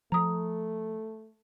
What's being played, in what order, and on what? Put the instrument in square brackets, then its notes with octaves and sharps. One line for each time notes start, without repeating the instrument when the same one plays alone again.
[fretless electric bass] F3 [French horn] A3 [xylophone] A#5 D#6